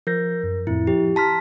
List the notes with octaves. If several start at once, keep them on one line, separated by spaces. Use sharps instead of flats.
F3 A#4 G6 A#6
F#2
F2 A2 E4
F3 G4
A5 A#5 C6 F6 B6